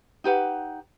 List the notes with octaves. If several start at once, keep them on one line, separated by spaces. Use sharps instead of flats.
D#4 G4 B4 F#5